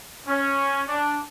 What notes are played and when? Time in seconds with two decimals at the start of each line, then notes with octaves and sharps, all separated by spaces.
0.26 C#4
0.87 D4